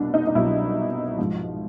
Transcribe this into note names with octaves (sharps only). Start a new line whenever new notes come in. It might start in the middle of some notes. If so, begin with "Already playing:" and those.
Already playing: C2 B2 D4
D#4
D#4
C2 B2 F#3 E4
G#2 F3